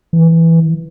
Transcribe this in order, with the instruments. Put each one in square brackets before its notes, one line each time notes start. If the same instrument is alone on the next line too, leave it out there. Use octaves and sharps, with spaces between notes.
[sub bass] E3